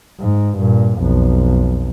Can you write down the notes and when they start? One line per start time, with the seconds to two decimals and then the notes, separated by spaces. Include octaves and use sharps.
0.20 G#2
0.58 G2 A#2
0.98 B1 F2